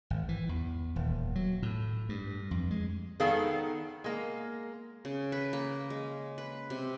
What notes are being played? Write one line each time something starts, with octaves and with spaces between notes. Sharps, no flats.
G#1
E3
E2
D#1
F#3
A2
G2
F2
G#3
D#3 B3 G#4 A4 F5
G#3 A#3
C#3
B4
A#3
G#3
B4
C3